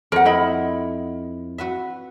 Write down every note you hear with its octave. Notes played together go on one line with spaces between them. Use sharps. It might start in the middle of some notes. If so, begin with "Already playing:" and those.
F2 A#4 F#5
E4 D#5 B5
F#4 B4 E5